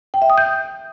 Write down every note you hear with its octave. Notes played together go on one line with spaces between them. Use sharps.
G5
E5
D#6
G6